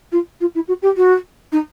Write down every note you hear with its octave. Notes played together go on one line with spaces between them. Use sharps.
F4
F4
E4
F#4
G4
F#4
D#4